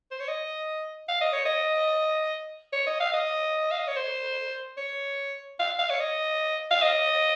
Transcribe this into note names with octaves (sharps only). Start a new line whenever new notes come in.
C5
C#5
D#5
F5
D#5
C#5
D#5
C#5
D#5
F5
D#5
F5
D#5
C#5
C5
C#5
F5
F5
C#5
D#5
F5
D#5